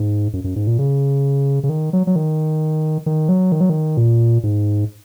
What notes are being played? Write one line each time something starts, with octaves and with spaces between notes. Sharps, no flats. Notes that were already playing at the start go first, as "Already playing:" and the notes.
Already playing: G#2
F#2
F#2
G#2
A#2
C#3
C#3
D#3
F#3
F#3
D#3
D#3
F#3
D#3
F#3
D#3
A#2
G#2